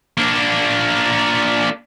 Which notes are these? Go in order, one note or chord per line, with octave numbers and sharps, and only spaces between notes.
A#3 D4